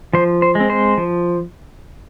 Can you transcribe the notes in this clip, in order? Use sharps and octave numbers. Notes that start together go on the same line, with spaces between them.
F3 C5
C5
G#3
C4
C5
F3